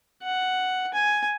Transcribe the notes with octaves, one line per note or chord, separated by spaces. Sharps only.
F#5
G#5